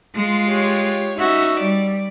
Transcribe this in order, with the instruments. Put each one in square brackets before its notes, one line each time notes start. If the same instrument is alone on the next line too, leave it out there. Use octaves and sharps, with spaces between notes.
[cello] G#3 F4
[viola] G4 C#5
[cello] C#4 F#4 [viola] D#4 E5
[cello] G3 [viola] D5